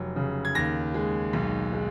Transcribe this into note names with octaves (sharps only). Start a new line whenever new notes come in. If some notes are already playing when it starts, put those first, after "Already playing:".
Already playing: F1 F#3
C#3
G#6
D#2 A#6
G#3
B1
G#3